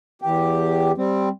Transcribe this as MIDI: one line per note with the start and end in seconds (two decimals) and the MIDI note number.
0.22 0.92 40
0.22 0.92 67
0.98 1.29 55
0.98 1.29 60